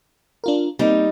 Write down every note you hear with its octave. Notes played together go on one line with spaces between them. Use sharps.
D4 F4 A#4
G3 A#3 C4 D#4